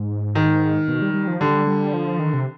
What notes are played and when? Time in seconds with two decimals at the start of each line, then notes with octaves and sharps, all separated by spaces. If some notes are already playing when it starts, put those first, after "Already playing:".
Already playing: G#2
0.35 D#3
0.88 B2
1.02 G3
1.14 G3
1.27 F3
1.40 D3 G3
1.67 G3
1.94 F3
2.19 D#3
2.34 C3